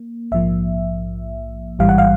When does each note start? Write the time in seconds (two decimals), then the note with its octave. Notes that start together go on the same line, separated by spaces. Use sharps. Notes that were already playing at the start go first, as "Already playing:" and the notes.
Already playing: A#3
0.32 A#1 G#2 F3 A#3 E5
1.79 A1 G#2 E3 G3 F5
1.89 F#5
1.98 F5